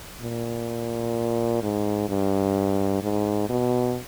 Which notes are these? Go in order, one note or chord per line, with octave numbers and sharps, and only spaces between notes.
A#2
G#2
G2
G#2
B2